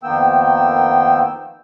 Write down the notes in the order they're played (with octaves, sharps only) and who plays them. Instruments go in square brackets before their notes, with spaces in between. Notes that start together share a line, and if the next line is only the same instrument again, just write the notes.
[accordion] F2 D#3 A#3 B3 G5 E6